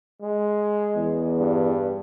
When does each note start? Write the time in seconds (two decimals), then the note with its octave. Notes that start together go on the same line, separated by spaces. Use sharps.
0.22 G#3
0.96 E2
1.38 G2